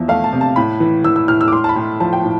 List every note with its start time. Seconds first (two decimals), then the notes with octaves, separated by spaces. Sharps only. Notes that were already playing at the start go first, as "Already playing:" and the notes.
Already playing: E2 F3 E5
0.08 A3 F5
0.24 A5
0.33 C3
0.41 A5
0.56 A2 B5
0.80 E3
1.04 E3 E6
1.16 E6
1.28 A2 F6
1.41 E6
1.48 D6
1.52 A2 C6
1.64 A5
1.69 B5
1.76 A2
2.00 F3 A5
2.13 G5
2.25 A2